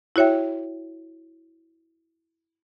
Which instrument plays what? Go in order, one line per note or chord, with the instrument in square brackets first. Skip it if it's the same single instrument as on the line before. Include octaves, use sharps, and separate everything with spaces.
[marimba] E4 F#4 C#5 E5 G5